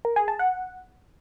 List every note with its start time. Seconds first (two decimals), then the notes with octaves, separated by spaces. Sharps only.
0.05 A#4
0.16 G#4
0.28 A5
0.39 F#5